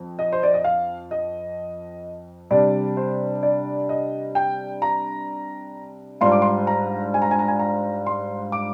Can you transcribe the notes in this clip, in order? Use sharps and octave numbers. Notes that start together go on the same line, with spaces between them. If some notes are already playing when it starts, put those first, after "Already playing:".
Already playing: F2
D#5
C5
D5
D#5
F5
D#5
C3 G3 D4 D5
C5
D5
D#5
G5
A#5
G#2 G3 D4 F4 C6
D6
C6
A#5
G#5
A#5
G#5
A#5
G#5
A#5
C6
D6